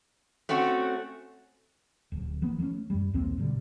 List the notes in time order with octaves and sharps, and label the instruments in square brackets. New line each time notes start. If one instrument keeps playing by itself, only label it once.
[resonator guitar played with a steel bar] A3 C4 C#4 F#4
[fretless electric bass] D1
F3 A#3 B3
F3 A3 A#3 C#4
F#2 G3
A#1 D#2 A#3 C4
G#2 B2 D3 G3